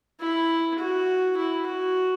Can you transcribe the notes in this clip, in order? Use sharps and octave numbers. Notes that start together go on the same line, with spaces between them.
E4
F#4
E4
F#4